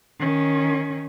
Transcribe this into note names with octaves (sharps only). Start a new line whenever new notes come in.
D#3 C#4